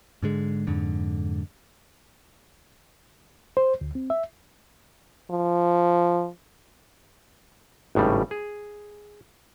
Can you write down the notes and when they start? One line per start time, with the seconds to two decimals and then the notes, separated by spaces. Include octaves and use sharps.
0.22 G#2 D3 G#3
0.67 F2 G#2 D3
3.57 C5
3.81 D2
3.95 C4
4.10 E5
5.31 F3
7.95 G#1 A2 C#3 G3
8.31 G#4